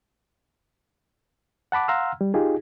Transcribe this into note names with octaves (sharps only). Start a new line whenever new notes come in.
F#5 A5 B5 D6
F5 F#5 A#5 C6 E6 F6
G3
D#4 F4 G4 G#4